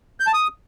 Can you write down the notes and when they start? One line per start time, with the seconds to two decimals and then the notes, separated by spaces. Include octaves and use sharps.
0.20 G6
0.27 A5
0.34 D#6